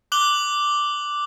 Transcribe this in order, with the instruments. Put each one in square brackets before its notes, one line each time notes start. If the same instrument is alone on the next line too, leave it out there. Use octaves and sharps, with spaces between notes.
[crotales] D6 F#6 F#7 G7